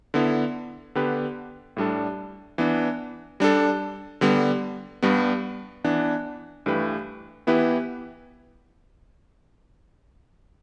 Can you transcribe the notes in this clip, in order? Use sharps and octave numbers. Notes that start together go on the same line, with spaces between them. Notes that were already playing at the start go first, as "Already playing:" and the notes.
D3 B3 E4
D3 B3 G4 B4
A2 G3 D4 A4
E3 B3 D4
G3 D4 A4
D3 G3 B3
G2 G3 B3
E3 B3 D4
G2 E3 A3 G4 B4
E3 B3 E4 G4 B4